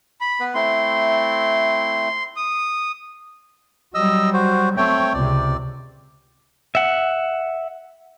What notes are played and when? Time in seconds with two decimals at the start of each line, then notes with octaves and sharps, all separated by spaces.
0.21 B5
0.40 B3 B4
0.55 A3 C4 E4 C6
2.37 D#6
3.94 F#3 G3 D#5 E6
4.33 F#4 C5
4.77 A3 C4 C#5 G5
5.14 C#2 C3 D5
6.75 E5 F#5